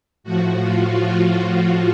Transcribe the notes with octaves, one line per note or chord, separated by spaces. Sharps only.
A2 F3 F#4
F4
F#4